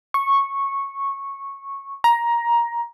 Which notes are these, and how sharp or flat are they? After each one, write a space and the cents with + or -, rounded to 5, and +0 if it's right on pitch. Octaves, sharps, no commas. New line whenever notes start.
C#6 -10
A#5 +15